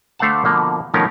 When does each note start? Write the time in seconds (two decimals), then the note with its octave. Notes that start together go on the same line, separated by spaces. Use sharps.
0.19 D3 A3 C5 F5 F#5 A5
0.45 B2 D3 F3 A#3
0.94 B2 D#3 F3 A3 C#4 A#4